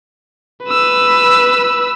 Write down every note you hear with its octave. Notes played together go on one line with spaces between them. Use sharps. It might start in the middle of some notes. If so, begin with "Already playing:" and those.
B4 E6